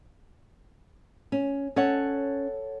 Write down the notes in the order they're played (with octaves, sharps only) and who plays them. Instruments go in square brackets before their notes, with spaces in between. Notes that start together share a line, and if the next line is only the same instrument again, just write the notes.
[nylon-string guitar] C#4
[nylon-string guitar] C#4 [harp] A4 C#5 F#5